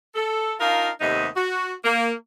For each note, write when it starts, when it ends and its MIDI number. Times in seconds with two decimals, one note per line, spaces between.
0.15 0.54 69
0.60 0.89 62
0.60 0.89 63
0.60 0.89 65
0.60 0.89 70
0.60 0.89 77
1.01 1.27 39
1.01 1.27 48
1.01 1.27 57
1.01 1.27 59
1.01 1.27 63
1.01 1.27 75
1.36 1.72 66
1.84 2.12 58